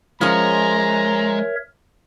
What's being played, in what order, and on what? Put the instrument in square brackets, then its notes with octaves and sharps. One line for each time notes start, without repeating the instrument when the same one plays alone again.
[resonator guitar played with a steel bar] F3 C#4 [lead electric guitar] G#3 [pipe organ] A#4 C#5 E5 [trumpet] A#5